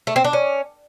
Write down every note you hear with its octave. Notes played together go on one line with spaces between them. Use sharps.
A3
C4
D4
C#4